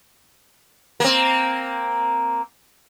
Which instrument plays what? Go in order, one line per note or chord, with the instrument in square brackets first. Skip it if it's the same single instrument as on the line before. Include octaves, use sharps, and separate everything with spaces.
[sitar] A#3 C4